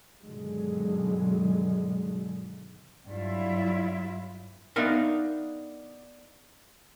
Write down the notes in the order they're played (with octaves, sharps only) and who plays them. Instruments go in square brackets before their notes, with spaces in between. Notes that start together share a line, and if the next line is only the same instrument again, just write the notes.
[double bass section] G2 B2 D3 D#3 F#3 G#3
[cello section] G2 F#3 E4 F4 E5
[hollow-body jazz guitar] B3 D4 D#4 A#4 E5 F5